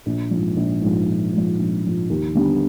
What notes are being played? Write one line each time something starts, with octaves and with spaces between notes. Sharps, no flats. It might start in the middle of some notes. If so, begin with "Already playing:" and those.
A#1
G#2 F3
A#1
G#2 F3
A#1
G#2 F3
A#1
G#2 F3
D#2
D3 G3 B3 D4